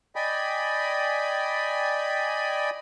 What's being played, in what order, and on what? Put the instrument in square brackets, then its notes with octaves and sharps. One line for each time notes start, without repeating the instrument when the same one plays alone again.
[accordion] D5 D#5 G5 G#5 B5